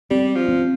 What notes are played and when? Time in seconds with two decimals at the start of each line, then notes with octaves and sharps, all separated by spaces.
0.11 G3 C4
0.36 F3
0.48 C4